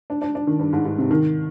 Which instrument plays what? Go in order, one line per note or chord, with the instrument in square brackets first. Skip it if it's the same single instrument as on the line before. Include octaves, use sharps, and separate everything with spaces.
[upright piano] D4
D4
D4
D#3
G2
G#2
G#2
C3
D#3